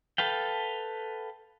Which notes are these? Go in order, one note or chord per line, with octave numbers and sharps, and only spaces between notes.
A4 B4 F5 G5